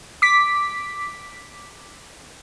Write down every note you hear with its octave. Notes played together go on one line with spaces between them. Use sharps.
D6 B6